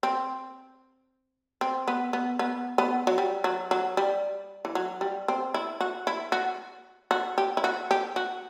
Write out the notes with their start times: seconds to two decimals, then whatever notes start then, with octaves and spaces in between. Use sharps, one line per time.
0.03 C4
1.61 C4
1.88 B3
2.13 B3
2.39 B3
2.78 B3
3.07 F#3
3.18 G3
3.44 F#3
3.71 F#3
3.97 G3
4.65 E3
4.75 F#3
5.01 G3
5.28 C4
5.54 E4
5.81 F#4
6.07 E4
6.32 F#4
7.11 F#4
7.38 G4
7.57 E4
7.64 F#4
7.91 G4
8.16 F#4